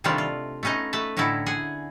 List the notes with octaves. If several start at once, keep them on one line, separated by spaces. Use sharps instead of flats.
C3 D#3 G3 A3 D4 F4
F4
A3 B3 C#4 D#4 D#5
A3 B4 A5
A2 D3 C#4 D#4 E4 A4
G#4 F#5 G#5